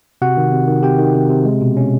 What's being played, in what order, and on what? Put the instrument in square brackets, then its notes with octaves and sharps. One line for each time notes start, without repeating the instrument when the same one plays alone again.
[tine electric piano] C3 F#4 F#5
D#3
C3
D#3
C3 G4 G5
D#3
C3
C3
G#3
B2
C#4